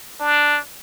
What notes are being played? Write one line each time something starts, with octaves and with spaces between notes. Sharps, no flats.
D4